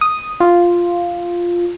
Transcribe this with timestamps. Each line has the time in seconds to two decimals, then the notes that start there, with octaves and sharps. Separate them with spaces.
0.01 D#6
0.40 F4